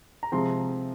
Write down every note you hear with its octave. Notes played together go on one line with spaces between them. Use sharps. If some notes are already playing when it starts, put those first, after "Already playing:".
A#5
C3 F3 G#3 C4 C6